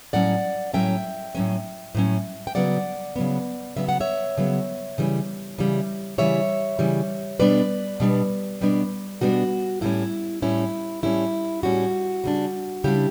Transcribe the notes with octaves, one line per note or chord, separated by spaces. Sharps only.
A2 F#3 C#4 D5 F#5
A2 F#3 C#4 E5 G5
A2 F#3 C#4
A2 F#3 C#4
G5
C#3 F#3 B3 D5 F#5
C#3 F#3 B3
C#3 F#3 B3 E5
F#5
C#5 E5
C#3 F#3 B3
C#3 E3 G3
C#3 E3 G3
C#3 E3 G3 C#5 E5
C#3 E3 G3
B2 G3 B3 D4 B4 D5
B2 G3 B3 D4
B2 G3 B3 D4
B2 G3 B3 D4 F#4
A2 G3 C#4 E4
A2 G3 C#4 E4
A2 G3 C#4 E4
A2 G3 C#4 F#4
C#3 G3 D4
C#3 G3 D4 E4 G4